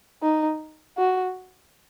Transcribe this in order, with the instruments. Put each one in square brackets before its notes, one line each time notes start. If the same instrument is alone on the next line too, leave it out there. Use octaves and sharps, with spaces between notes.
[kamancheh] D#4
F#4